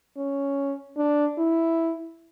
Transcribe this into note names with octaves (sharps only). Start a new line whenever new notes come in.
C#4
D4
E4